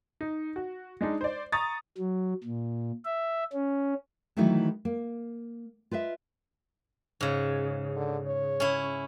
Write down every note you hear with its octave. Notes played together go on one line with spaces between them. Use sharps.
D#4
F#4
G#3 D4 D#4
C5 D5
A#5 C#6 D#6 A6
F#3
A#2
E5
C#4
D#3 E3 F#3 A3 D#4 E4
A#3
F4 B4 D#5 E5
G#2 C#3
D3
C#5
C#4 E4